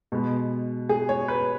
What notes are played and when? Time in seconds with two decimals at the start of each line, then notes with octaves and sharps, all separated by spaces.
0.12 B2 G#3 B3
0.89 G#4
1.09 C#5
1.28 B4